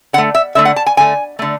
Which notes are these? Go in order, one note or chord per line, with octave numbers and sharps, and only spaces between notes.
D3 A3 F#5
E5
D3 A3 E5
F#5
A5
G#5
D3 A3 G#5
D3 A3